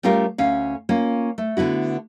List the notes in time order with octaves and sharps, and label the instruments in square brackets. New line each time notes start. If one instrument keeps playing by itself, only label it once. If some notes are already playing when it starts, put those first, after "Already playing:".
[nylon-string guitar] G3 A3 C#4 F4 G4 A#4
D2 C#4 F5
A#3 C#4 F4
A3
D3 B3 E4 F#4